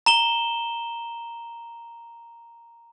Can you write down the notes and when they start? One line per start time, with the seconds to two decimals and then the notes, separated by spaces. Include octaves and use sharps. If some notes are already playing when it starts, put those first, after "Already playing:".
0.06 A#5 E7 G7